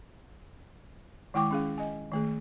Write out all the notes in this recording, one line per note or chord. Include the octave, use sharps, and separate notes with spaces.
D#3 G#3 E4 G5 C#6 D6
C#4 G#4 F5
D#5 G#5
D#3 A3 G#4